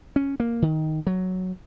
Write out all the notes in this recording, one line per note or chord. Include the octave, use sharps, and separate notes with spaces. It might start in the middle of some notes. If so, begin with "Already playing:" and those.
C#4
A#3
D#3
F#3